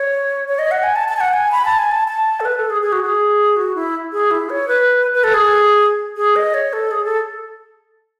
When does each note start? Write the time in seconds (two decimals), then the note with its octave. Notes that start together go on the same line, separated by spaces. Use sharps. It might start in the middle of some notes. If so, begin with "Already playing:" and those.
Already playing: C#5
0.48 C#5
0.59 D#5
0.71 F#5
0.83 G#5
0.96 A5
1.08 A5
1.16 G#5
1.21 F#5
1.33 G#5
1.52 B5
1.65 A5
1.78 G#5
1.91 A5
2.08 A5
2.40 A4
2.45 B4
2.57 A4
2.70 G#4
2.82 G#4
2.92 F#4
3.03 G#4
3.56 F#4
3.75 E4
4.13 G#4
4.31 E4
4.50 C#5
4.68 B4
5.14 B4
5.24 A4
5.34 G#4
6.17 G#4
6.36 D#5
6.54 C#5
6.73 A4
6.91 G#4
7.05 A4